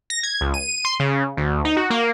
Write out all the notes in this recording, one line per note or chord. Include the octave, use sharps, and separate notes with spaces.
A#6
G#6
C#2
D#7
C6
C#3
D2
D#4
F#4
A#3